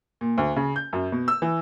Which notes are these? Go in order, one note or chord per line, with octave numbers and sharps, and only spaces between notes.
A#2
D2
C#3
G6
F#2
B2
E6
E3